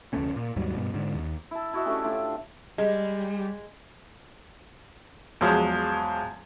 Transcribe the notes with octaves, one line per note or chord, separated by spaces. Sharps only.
F1 D2 A3 C#4
A#2
D#2 G#2 F#3 G3
G2 B2
G#2 D3
D#2
E4 A5
E4 F#4 D#5 E5
A3 C#4 D4 G4
A2 D4 F4 A5
G3 G#3
E2 F3 F#3 G#3